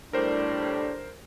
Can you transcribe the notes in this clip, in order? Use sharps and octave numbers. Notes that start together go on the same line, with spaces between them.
A2 G3 D4 A#4 C5